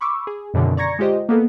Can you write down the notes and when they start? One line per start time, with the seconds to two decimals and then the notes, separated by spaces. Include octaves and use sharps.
0.01 B5 C#6 D6 E6
0.27 G#4
0.54 F#2 B2 D3 D#3
0.77 D5 A#5 C#6 G#6 A#6 C#7
0.99 G#3 F4 G4 C5 D#5
1.29 A#3 B3 A4